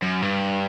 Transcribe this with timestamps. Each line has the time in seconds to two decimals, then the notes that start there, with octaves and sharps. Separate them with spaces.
0.03 F#2
0.22 G2